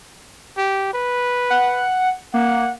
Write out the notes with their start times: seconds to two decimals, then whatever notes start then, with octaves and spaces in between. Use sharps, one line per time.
0.58 G4
0.94 B4
1.50 F#5
2.34 A#3 F#5